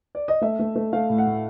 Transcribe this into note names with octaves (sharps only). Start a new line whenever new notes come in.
D5
D#5
A3 E5
A3
A3
A3 F5
A2
F#5
A2